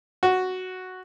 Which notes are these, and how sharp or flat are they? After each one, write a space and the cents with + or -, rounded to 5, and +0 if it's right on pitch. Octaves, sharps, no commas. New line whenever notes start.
F#4 +0